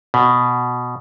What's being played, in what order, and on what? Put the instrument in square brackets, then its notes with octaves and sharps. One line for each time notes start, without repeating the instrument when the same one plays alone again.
[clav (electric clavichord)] B2